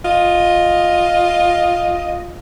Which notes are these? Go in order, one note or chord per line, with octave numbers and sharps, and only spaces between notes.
F4 D#5